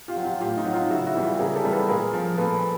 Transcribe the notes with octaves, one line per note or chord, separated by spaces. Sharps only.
F4 G4
F#3
F4 G4
A2 F4 G4
D#4 F4
F#3
D#4 F4
C#3 E4 F#4
E4 F#4
E3 G3
F4 G4
C#3 G#4 A#4
G4 A4
E3 G3
A4 B4
A#2 G#4 A#4
F3
A#2 A4 B4